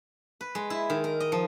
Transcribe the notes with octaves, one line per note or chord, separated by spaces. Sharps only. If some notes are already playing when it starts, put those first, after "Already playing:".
B4
G#3
E4
D#3
A#4
D#5
F3